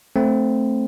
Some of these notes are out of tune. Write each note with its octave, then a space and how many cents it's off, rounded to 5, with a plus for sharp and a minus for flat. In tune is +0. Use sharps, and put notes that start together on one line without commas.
A3 +0 C4 +0